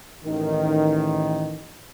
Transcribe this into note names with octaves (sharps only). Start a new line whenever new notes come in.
A1 D#3